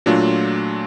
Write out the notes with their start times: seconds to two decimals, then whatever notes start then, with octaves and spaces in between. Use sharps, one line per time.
0.06 A#2 F#3 A3 D4 F4